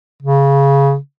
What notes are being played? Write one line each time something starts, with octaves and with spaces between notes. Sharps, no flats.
C#3